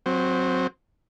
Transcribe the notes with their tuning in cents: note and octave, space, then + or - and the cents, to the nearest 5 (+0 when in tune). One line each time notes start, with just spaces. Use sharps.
F#3 -15 C4 +0